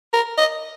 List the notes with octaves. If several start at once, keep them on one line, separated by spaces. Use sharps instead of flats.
A#4
D#5